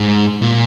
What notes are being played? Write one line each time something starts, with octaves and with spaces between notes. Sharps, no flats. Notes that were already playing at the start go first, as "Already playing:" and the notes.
Already playing: G#2
A#2